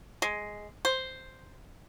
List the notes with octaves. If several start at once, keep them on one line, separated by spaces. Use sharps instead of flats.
G#3
C5